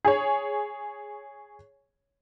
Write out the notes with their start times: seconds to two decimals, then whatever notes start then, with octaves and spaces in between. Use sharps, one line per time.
0.05 G#4 C#5